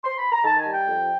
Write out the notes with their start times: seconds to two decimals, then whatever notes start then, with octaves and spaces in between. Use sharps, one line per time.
0.04 C6
0.18 B5
0.31 A#5
0.44 D#3 A5
0.58 G#5
0.65 G3
0.72 G5
0.86 F2